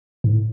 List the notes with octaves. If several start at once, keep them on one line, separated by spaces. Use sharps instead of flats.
G#2
A2